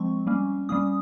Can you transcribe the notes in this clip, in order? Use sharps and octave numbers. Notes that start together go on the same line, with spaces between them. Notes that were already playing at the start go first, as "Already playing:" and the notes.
Already playing: F3 G#3 C4 C#6
G3 A#3 C#4
G3 A#3 C#4 D#6